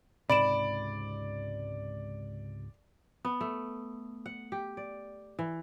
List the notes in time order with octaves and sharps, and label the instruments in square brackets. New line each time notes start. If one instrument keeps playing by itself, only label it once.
[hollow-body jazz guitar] C#2 G#2 C3 [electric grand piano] D5 [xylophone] B5 D7 E7
[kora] B3
A3
F#5
G4
D5
E3